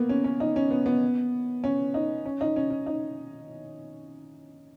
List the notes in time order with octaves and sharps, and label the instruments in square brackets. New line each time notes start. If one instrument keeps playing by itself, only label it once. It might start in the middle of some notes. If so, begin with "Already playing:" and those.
Already playing: [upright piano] A#3 B3
C#4
C#4
D#4
C#4
B3
B3
C#4
D#4
C#4
D#4
C#4
C#4
D#4